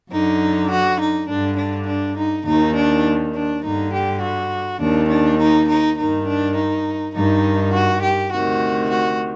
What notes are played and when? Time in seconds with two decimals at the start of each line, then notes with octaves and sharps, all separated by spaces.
0.11 F#2 D3 D#4
0.70 F#4
1.00 D#4
1.29 G2 D3 D4
1.58 D4
1.87 D4
2.18 D#4
2.46 D#2 D#3 D#4
2.76 D4
3.34 D4
3.64 G2 D3 D#4
3.93 G4
4.22 F#4
4.81 D#2 D#3 D4
5.10 D4
5.39 D#4
5.69 D#4
5.98 G2 D#3 D#4
6.27 D4
6.56 D#4
7.15 G2 D#3 D#4
7.74 F#4
8.03 G4
8.32 D2 C3 D#3 F#4
8.91 F#4